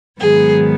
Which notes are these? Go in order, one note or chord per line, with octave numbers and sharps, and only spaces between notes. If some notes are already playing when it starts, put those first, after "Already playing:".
G#2 D#3 F#3 B3 G#4